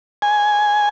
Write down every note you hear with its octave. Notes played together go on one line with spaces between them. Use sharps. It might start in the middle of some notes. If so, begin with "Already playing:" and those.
G#5